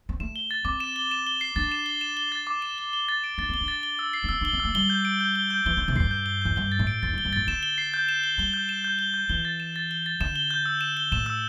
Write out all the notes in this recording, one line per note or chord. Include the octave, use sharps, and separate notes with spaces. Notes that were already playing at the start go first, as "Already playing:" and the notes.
C4
A3 E7
G7
A6
C4 D6
E7
G7
E7
G7
C7
D4 A6
E7
G7
E7
G7
A6
D6
E7
G7
G7
A6
D7
D4 A6
C4 G7
D4
A6
G7
E6
C7
D4
C4 E6
D4 G7
C4
A3 E6
G3 G7
G6
D7
G6
G7
G6
E3 G7
D3 G6
C3
E2 G2 C7
G6
G7
E2 G6
G2 G7
A6
A2
D7
E2 A6
G2
G7
G2
A2 A6
D3 E7
G7
C7
G6
E7
G7
G3 G7
G6
E7
G6
G7
G6
E3 G7
A6
E7
A6
G7
A6
D3 E7
G7
G6
E6
E7
G7
A2 E7
E6